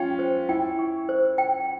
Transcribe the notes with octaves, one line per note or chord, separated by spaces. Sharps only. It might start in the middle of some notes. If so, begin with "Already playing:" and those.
Already playing: C#4 F4 G5
C5
E4 G5
C#6
C5
G5